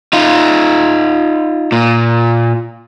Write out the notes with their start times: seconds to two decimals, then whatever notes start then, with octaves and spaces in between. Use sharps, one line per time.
0.13 D#4 F4
1.72 A#2